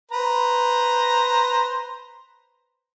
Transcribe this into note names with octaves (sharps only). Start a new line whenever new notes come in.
B4 C5 A#5